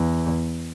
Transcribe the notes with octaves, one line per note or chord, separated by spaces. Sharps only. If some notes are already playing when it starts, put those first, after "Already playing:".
Already playing: E2